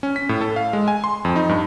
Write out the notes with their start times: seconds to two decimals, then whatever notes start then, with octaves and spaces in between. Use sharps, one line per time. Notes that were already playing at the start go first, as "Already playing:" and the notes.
0.03 C#4
0.16 B6
0.29 A2
0.41 A4
0.56 F5
0.73 G#3
0.88 G#5
1.04 C6
1.25 F2
1.36 D#4
1.49 G2